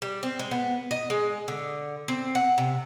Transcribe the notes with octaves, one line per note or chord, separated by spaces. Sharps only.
G3
C4
G#3
B3
D#5
G#3
D3
C4
F#5
C3